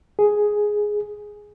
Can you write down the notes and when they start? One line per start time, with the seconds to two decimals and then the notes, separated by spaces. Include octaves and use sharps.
0.19 G#4